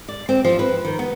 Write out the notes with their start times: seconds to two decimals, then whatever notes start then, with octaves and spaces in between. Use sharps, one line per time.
0.09 D5
0.29 C4
0.44 F3
0.59 B4
0.85 D#3
0.99 B3